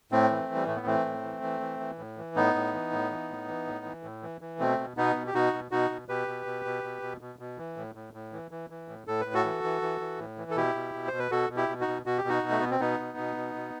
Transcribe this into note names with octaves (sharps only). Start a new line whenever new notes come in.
A2 A3 C4
E3
E3
G3
A2 A3
B3
E3 A3 C4
A2
E3
E3
E3
E3
A2
E3
A2 B3 D#4
A2
E3
A2
E3
A2
E3
A2
E3
A2
E3
E3
B2 A3 C4
B2
B2 B3 D#4
B2
G4
B2 D#4 F#4
B2
B2 D#4 F#4
B2
B2 G4 B4
B2
B2
B2
B2
B2
B2
B2
E3
A2
A2
A2
E3
E3
E3
A2
A2 A4
B4
A2
F#4 A4
E3
E3
E3
E3
A2
E3
A4
B2 E4 G4
B2
B2
C5
B2
B4
B2 F#4 A4
B2
E4 G4
B2
D#4 F#4
B2
B2 F#4
G4
B2 D#4 F#4
B2
A3
B2 B3
C4
B2 B3 D#4
B2
B2
B2
B2